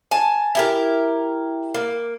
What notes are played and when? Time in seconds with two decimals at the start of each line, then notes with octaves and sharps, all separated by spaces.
0.11 G#5 A5
0.55 E4 G4 A#4
1.74 A#3